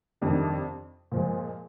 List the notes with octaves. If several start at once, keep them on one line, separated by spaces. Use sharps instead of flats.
F2 C3 D#3 G3 D4
A#2 F3 G#3